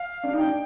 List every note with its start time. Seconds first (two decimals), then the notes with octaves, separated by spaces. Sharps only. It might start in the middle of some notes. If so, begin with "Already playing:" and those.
Already playing: F5
0.23 D4
0.33 D#4
0.38 D4 G5